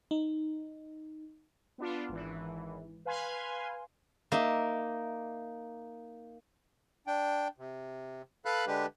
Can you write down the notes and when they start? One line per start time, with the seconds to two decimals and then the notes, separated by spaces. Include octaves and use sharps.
0.11 D#4
1.78 B3 D4 F4
2.09 G#1 E3
3.05 B4 F5 G#5 C6
4.32 A#3 D#4 E5
7.07 D4 G5
7.58 C3
8.45 A4 B4 F5 B5 F#6
8.67 D3 G#3 D4 G4 B4